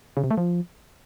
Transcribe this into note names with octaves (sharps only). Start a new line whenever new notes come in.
C#3
C3
A3
F3